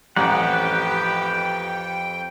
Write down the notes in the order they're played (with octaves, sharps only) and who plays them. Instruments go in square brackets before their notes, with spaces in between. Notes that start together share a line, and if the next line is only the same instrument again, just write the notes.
[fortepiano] A1 [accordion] F2 G5 [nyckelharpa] G4 B4 [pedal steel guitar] F#5